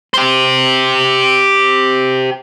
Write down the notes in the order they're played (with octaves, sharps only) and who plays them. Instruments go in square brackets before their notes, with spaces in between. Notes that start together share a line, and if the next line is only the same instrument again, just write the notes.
[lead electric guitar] G4 C5